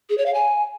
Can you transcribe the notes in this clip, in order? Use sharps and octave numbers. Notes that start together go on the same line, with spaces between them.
G#4
C#5
F5
G#5